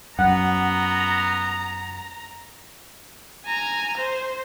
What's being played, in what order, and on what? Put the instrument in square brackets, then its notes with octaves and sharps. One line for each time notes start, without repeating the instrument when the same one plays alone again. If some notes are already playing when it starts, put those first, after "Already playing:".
[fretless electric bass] F#2 [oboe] B3 [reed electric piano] F#5 [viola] A#5
[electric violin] G#5 A#5
C5